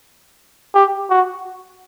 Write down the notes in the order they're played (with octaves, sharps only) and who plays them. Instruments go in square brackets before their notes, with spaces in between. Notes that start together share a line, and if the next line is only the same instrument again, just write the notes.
[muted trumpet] G4
F#4